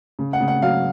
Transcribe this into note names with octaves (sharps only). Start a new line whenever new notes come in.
C#3
F#5
C#3
F#5
F#3 F5